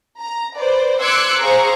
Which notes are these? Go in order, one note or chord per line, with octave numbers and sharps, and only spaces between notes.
A#5
B4 C5 D5
C6 D6 E6 F#6 G#6 C#7
G#4 C5 F5 A#5 C#6